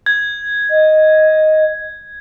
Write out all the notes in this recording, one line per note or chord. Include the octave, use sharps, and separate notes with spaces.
G#6
D#5